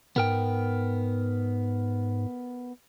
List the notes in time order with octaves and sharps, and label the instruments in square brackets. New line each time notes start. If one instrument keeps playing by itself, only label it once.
[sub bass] G#2 [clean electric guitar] B3 A#4 G5